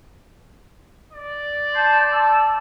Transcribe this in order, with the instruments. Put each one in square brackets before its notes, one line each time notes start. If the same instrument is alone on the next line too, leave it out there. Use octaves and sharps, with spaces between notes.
[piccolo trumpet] D5
[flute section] A5 C6 G6
A5 D6 E6